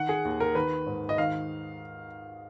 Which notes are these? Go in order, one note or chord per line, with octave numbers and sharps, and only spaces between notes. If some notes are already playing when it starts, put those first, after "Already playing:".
Already playing: D#3 F#5
G#4
D#2
A#4
D#3 B4
G#2
D#5
D#3 F5